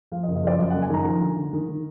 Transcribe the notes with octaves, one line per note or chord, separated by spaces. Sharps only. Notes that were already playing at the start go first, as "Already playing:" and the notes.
F3 F5
D#5
F#1
D#5
F3 D5
F#2 D#5
F#1 F#5
G#5
D#3 A#5
F3
D3
D3
D#3
D#3